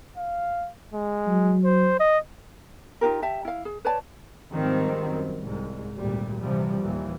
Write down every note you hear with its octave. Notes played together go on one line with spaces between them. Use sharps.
F5
G#3
F#3
C5
D#5
D#4 F4 G4 A#4
G4 E5 A5
E4 F5
G#4
B4 C#5 D5 A5
G#2 D#3 F3 G3 C4
F#2
C2 G#2
G#1 D2 A#2 G3
C3 E3 F3 G3
D#2 A#2 E3